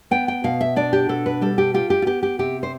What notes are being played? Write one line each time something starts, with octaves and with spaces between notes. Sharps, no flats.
B3 G5
G5
B2 F5
E5
D4 D5
G4
B2 A4
B4
G3 A4
G4
F4 G4
G4
F4
B3 G4
G4
C3 G4
C5